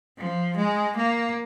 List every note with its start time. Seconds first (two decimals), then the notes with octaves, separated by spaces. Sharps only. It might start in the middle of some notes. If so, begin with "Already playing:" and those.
0.18 F3
0.57 G#3
0.96 A#3